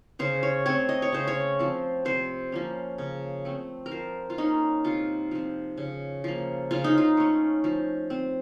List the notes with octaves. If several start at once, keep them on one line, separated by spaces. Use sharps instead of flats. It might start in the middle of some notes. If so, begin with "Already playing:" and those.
C#3 C5
C#5
A3 C4 C#5
D#5
C#5
C#3 C5
C#5
F3 C4
C3 C5
F3 A#3 C#4
C#3
A3 C4
A#4
F3 C5
F4
A#3 C#4 D#4
C3 F4
F3 C4
C#3
F3 A#3
C#3 F4
D#4
F4
A3 C#4
F3
C4